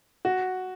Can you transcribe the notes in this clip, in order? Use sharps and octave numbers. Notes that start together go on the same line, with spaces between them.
F#4